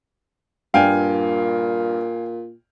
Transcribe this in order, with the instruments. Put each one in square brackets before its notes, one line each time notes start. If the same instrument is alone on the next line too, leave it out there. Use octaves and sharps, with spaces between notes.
[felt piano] G2 [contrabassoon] A#2 [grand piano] F5 G5 G#5